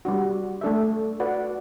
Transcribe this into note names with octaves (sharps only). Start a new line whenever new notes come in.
G3 D4 F#4
A3 D4 A4 E5
F#4 B4 D5 F#5